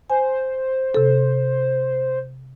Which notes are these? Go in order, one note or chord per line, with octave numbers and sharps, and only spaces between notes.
C5 G#5
C3 A4